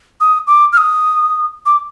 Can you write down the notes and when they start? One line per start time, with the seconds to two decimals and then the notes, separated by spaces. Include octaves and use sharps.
0.21 D#6
0.47 D6
0.73 F6
0.78 D#6
1.66 D6